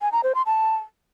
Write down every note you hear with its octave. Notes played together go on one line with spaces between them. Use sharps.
G#5
A#5
C5
C6
A5